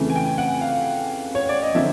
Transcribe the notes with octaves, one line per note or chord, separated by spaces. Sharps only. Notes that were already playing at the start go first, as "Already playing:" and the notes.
Already playing: F2 C#3 E3 A3
G#5
G5
F#5
F5
C#5
D5
D#5
D3 F3 A#3 E5